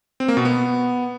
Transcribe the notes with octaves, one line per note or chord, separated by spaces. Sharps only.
C4
A#3
B2
B3